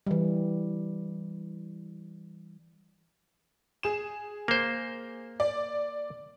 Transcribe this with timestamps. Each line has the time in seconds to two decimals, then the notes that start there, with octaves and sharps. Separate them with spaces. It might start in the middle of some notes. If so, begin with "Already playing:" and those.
0.07 E3 G3
3.83 G#4 E7
4.48 A#3 C5
5.40 D5